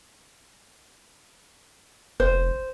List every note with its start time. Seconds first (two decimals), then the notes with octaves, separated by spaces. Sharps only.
2.20 F1 C5